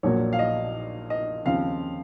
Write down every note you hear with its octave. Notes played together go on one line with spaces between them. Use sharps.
A#1 A#2 F#3 A#3 C#5
F5
D#5
D#5
D#2 C#3 F3 C4 F5